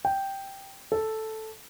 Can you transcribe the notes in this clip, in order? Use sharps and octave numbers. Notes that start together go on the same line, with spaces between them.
G5
A4